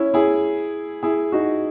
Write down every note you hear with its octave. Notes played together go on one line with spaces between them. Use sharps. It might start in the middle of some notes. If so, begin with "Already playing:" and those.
Already playing: C#4 E4
E4 G#4
E4 G#4
D#4 F#4